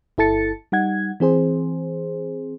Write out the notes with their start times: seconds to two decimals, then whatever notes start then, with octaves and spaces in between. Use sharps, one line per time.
0.18 G1 E4 A4 A5 A6 C#7
0.72 G3 D#4 F#5 G#6
1.20 E3 C4 G#4 C5